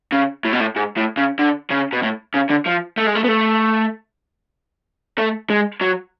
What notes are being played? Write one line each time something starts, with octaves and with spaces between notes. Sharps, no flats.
C#3
A2
B2
A2
G#2
A2
C#3
D3
C#3
B2
A2
C#3
D3
F3
A3
G#3
A3
B3
A3
A3
G#3
F#3